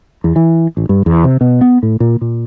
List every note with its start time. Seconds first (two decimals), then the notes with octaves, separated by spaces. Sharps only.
0.24 E2
0.36 E3
0.77 A1
0.89 G2
1.06 E2
1.24 C3
1.41 B2
1.61 B3
1.83 A2
2.00 A#2
2.21 A#2